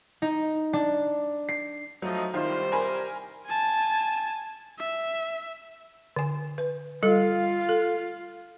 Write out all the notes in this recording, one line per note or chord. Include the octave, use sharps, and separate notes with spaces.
D#4
D4
C7
F3 F#3 A3 D#4
C2 D#3 G3 F4 C5
A#4 G#5 B5
G#5 A5
E5
D3 G#5
B4
G3 F4 A4 F5
A4